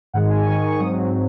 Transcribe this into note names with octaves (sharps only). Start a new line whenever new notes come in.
G#2 D#3 G#3 F#5
G#5
G#2 D#3 G#3 C#6
C#6
C#6
G#2 F#3 C4 D#6